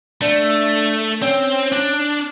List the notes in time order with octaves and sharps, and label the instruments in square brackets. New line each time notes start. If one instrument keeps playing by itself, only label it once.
[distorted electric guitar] A3 [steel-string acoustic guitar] D4
[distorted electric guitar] C4 [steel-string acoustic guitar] C#4
[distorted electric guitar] D4